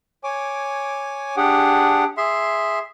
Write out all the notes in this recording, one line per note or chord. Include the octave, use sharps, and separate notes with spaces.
C#5 G#5 D6
D4 G4 G#4 F#5
G#4 E5 C6